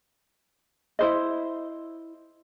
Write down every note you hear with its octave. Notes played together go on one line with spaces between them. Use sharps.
E4 C5 D#5